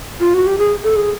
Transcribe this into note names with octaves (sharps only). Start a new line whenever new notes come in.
F4
F#4
G4
G#4
A4
G#4